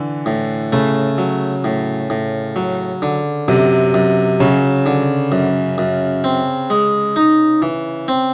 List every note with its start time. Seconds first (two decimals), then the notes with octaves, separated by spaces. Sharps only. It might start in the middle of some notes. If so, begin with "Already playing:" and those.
Already playing: D3 E3
0.26 A2
0.73 C#3 A3
1.18 F#3
1.64 A2
2.10 A2
2.56 F#3
3.02 D3
3.48 F#2 C3
3.94 F#2
4.40 C#3 F#3
4.86 D3
5.32 F#2
5.78 F#2
6.24 C4
6.70 G#3
7.16 D#4
7.62 E3
8.08 C4